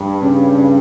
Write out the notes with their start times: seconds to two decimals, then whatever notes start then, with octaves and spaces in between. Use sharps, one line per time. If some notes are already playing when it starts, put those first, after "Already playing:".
Already playing: G2
0.22 C#3
0.55 C#3